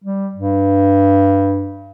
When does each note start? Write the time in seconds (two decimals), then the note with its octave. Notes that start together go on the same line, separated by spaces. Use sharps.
0.04 G3
0.35 G2